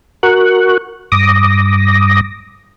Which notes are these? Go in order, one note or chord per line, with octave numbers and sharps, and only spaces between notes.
F#4 A#4 C#6 F#6
G2 D6 D#6 A#6